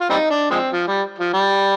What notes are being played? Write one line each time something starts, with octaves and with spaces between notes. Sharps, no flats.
F4
G3 C4 D#4
D4
F3 G#3 C4
F3
G3
F3
G3